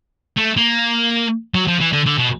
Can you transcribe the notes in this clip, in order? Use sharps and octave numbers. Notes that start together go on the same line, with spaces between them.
A3
A#3
F#3
F3
E3
D3
D3
B2